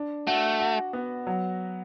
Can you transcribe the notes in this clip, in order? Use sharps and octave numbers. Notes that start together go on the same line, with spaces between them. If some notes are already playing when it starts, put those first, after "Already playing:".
Already playing: D4
A3 F#4
F#4
B3
F#3